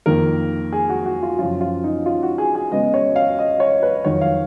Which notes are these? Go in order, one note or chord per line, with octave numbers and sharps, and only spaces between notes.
F2 D#3 A#3 A#4
G#4
F#4
F#4
F4
F#2 C#3 F3 F4
F4
D#4
F4
F#4
G#4
G#4
C#3 G#3 B3 D#5
C#5
F5
D#5
C#5
B4
F2 D#3 F#3 C#5
F5